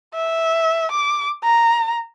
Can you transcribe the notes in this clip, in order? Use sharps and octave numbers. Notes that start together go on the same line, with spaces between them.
E5
D6
A#5